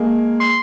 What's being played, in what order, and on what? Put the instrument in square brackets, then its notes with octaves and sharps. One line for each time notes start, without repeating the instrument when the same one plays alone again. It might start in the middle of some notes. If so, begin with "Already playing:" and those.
Already playing: [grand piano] G#3 A#3
[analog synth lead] C6